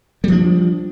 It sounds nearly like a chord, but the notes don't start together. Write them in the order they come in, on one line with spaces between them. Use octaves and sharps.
G3 F3 D4